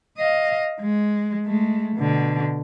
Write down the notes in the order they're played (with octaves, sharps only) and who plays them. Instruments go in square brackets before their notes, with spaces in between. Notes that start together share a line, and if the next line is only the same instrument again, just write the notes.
[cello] D#5 F5
G#3
G#3 A3
B2 D3